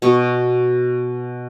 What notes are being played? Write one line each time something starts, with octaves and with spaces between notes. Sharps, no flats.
B2 C#6